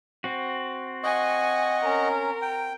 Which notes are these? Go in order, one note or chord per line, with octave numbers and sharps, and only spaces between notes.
C4 F#4
D#5 F#5 G#5 C#6
C#4 A#4
G5